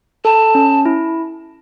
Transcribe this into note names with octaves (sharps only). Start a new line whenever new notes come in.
A4 A5
C#4
E4